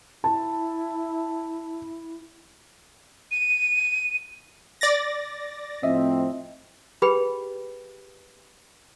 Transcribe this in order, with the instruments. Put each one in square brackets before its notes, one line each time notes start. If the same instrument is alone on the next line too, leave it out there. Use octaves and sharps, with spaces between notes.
[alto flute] E4 [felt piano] A5
[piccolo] D#7
[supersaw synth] D5 A6 A#6
[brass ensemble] A2 F3 C4 [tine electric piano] D#5 E5
[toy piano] G4 G#4 B4 G5 B5